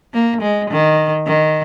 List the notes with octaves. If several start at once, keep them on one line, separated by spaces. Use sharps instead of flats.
A#3
G#3
D#3
D#3